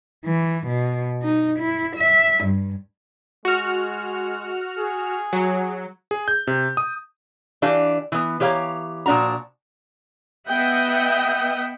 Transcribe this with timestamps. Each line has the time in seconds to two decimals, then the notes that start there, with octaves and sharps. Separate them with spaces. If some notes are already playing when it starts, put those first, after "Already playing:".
0.25 E3
0.67 B2
1.22 D#4
1.59 E4
1.96 E5
2.45 G2
3.45 G#3 F#4 F6
4.78 G#4
5.33 F#3
6.11 G#4
6.28 G6
6.47 C3
6.77 D#6
7.62 E3 D4 G4 B4 F5
8.12 E3 B3
8.40 E3 G4 C#5 F5 A#5
9.06 A#2 F3 D4 F#4 A#5
10.48 B3 D#5 E5 F#5 G5